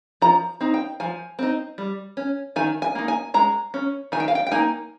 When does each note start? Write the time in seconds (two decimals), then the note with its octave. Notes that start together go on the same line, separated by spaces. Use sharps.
0.22 F3 A#5
0.61 C4 D#4
0.74 G5
1.00 F3 G#5
1.39 C4 D#4
1.78 G3
2.17 C#4
2.56 D#3 G#5
2.82 G#5
2.95 A#3 D#4
3.08 G#5
3.34 G#3 A#5
3.74 C#4
4.12 D#3 G#5
4.20 G5
4.28 F5
4.35 G5
4.47 G5
4.51 A#3 D#4 G#5